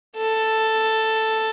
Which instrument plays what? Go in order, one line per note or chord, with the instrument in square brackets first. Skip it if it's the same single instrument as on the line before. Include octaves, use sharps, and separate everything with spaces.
[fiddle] A4